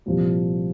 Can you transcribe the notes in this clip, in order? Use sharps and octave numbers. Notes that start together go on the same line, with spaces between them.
C2 A#2 F3